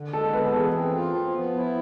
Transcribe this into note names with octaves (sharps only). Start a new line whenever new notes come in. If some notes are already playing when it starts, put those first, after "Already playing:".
Already playing: D3
G#3 A4
B3 B4
A4
E3 G#4
A4
C4
F4
F3
B3
E4